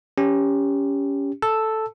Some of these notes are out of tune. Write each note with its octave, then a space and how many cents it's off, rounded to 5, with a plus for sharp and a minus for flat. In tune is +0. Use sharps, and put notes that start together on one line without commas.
C#4 +15 G4 +10
A4 +0 A5 +0 E6 +0